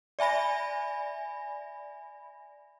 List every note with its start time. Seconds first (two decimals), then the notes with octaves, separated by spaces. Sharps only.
0.19 D5 E5 G#5 B5 A#6